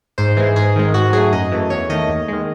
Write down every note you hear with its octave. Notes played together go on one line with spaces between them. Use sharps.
G#2 C5
E3 G#3 G#4
G#2 G#4
D#3 G#3
G#2 F#4
F#3 A3 G#4
F#2 D#5
E3 A3
E2 C#5
D#3 A3 D#5
D#2
D#3 G#3